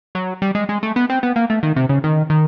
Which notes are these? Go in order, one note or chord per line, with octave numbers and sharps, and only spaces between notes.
F#3
G3
G#3
G#3
A3
B3
C4
B3
A#3
A3
D#3
C3
C#3
D#3
D#3